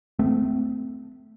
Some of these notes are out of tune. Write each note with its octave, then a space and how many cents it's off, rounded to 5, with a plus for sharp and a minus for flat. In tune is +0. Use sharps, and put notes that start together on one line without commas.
A3 +0 C4 -30